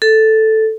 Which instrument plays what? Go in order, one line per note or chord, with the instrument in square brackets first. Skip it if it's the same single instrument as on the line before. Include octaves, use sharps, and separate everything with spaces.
[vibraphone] A4